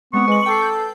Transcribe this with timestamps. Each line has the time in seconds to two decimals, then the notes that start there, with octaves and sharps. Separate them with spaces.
0.13 G#3 B3 C4 C#6
0.28 G#3 B4 F#7
0.46 A4 G5 D6 C7
0.62 G6